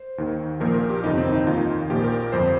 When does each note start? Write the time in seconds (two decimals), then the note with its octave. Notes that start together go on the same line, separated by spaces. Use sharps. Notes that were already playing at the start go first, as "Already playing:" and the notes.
Already playing: C5
0.18 D#2 D#3
0.60 A#1 A#2 F3 A#4
0.74 A#4
0.89 G4
1.04 G1 F2 C3 D#3 D#4
1.18 C4
1.32 D#4
1.47 D#2 D#3 F4
1.90 A#1 A#2 F3 G4
2.04 A#4
2.32 G1 F2 F3 C5